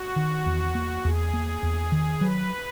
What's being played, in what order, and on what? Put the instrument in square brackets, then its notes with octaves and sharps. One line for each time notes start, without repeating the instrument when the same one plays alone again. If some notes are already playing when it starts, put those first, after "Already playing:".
Already playing: [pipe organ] F#4
[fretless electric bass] D#3
E2
A#3
[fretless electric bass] E2 [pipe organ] G#4
[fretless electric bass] A#3
E2
D#3
[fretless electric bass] F#3 [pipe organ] B4